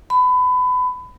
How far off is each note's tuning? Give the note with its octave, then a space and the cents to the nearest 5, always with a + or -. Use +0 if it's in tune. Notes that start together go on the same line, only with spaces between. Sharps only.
B5 +25